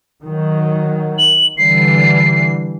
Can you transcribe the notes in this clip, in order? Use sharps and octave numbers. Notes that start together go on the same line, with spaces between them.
D#3 F#3
F#7
D3 E3 G3 C7